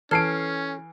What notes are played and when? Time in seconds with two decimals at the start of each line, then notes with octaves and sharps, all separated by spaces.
0.11 E3 C#4 A4 F6 G#6 C7 D7